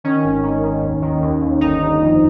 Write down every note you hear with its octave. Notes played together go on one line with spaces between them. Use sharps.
D#3 C#4
G#1
D#3
D#3
D#2
D#3
D#2
D#2
G1 D#4
G1
F2